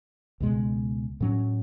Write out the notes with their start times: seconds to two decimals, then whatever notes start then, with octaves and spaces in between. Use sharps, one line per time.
0.40 C#2 B2 G#3
1.21 A2 F#3 C#4